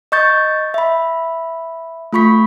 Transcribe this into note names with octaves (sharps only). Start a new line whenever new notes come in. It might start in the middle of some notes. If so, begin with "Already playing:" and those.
D#5 C#6 G6 A6
E5 B5
A3 F4 B5 C#6 B6